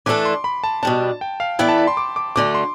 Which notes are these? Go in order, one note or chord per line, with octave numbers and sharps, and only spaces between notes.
E3 A3 D4 A4 D6
C6
B5
A5
B2 G3 D4 A5
G5
F5
E3 B3 E4 A4 D5 G5
A5
B5
C6
D6
D6
D2 D3 A3 D4 D6
C6